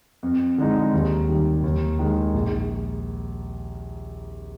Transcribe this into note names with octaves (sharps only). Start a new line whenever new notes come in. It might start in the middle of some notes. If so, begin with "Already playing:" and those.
F2
D3 G#3 D#4
D#2
D#3 G3
D#2
D#3 G#3
A#1